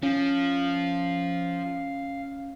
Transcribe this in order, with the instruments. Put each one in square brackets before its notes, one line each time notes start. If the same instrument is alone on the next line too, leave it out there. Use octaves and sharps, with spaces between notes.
[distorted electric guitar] F3 [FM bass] C#4 [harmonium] F5